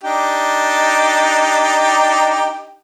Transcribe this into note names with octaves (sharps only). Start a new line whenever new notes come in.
D4 D#4 G4